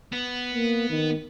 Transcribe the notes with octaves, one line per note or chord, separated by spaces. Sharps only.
B3
A#3
D#3